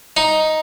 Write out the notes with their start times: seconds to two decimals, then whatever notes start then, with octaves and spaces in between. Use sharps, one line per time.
0.17 D#4